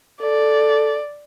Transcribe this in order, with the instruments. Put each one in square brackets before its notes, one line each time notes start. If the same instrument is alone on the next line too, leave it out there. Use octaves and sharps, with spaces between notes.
[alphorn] A4 [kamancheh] D5